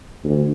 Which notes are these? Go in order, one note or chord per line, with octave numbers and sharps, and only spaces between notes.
D2